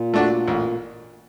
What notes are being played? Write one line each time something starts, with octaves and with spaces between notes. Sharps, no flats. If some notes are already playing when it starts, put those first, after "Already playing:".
Already playing: A#2
A3 D4 F#4
A1